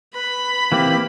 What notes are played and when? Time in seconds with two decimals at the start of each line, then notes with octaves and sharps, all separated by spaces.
0.15 B4 B5
0.72 E3 A#3 C4 G4